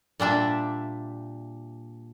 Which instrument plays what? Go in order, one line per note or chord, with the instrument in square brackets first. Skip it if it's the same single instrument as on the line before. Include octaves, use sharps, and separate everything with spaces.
[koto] A#2 G3 D4 E5